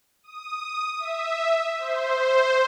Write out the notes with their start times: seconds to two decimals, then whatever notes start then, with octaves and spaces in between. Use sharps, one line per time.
0.23 D#6
0.99 E5
1.79 C5